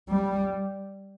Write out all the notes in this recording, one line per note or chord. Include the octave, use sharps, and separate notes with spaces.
G3